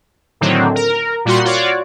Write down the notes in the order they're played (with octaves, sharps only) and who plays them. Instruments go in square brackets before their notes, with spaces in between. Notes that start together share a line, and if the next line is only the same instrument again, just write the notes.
[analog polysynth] A2 D3 D#3 F#3 C4
A#4
A#2 G3 F#4 C6
F4 F#4 C#5 D5